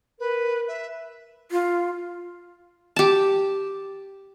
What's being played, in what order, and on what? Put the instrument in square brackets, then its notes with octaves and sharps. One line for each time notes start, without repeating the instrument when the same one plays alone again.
[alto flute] A#4 [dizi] B4
[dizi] E5
[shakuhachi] F4
[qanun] G4 A5